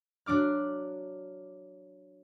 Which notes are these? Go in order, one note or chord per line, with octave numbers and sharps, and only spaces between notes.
F#3 D4 D6 F6